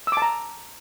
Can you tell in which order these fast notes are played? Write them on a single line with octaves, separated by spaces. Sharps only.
E6 D6 A5 A#5